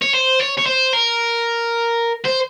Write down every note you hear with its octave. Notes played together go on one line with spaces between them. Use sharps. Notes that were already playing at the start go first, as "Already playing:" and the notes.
C#5
C5
C#5
C#5
C5
A#4
C5